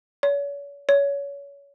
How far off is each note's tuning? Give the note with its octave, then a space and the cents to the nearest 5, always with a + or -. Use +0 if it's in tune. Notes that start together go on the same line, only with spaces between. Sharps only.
C#5 +40
C#5 +25